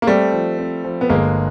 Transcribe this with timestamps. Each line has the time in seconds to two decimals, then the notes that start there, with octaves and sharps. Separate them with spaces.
0.02 A#3
0.07 G3 A3 C4
0.33 F3
0.59 C4
0.84 F3
1.01 B3
1.09 G1 G#3 A#3